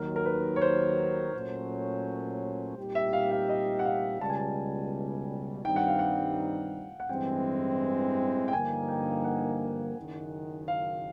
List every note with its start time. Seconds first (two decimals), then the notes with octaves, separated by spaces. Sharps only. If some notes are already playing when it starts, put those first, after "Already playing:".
Already playing: D#2 D#3 F#3 A#4
0.16 A#4
0.25 B4
0.56 C#5
0.62 C5
1.33 A#2 F#3 A3 C#4
2.77 A#2 G3 C4 D#4 G4
2.95 E5
3.13 F5
3.31 F5
3.49 D#5
3.79 F#5
3.85 F5
4.21 C#2 B2 G3 A5
4.29 G#5
4.37 A5
5.64 G2 D#3 G3 C4 D#4 G5
5.76 F#5
5.88 F5
5.99 F#5
7.00 F#5
7.09 A1 G2 E3 G#3 C4 G5
8.48 G5
8.52 G2 D3 F3 A#3 D#4 G#5
8.88 G5
9.24 F#5
9.97 F#1 F#2 D#3
10.68 F5